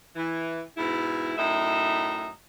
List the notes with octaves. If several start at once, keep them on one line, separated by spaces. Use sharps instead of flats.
E3
G#2 B2 E4
F#2 A2 D#4 E5